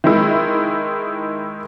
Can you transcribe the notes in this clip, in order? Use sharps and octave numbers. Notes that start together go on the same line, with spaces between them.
D#3 G#3 E4